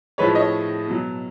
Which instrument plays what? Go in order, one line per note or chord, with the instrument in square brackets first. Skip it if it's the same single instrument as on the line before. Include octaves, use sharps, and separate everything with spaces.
[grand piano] A2 F3 G#3 B4 C#5
C#5 D#5
B2 F#3